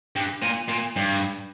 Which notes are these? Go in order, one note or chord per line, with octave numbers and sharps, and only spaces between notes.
G2
A#2
A#2
G2